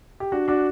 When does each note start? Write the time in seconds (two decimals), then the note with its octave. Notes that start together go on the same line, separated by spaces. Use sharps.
0.20 G4
0.32 D4 F#4
0.48 D4 F#4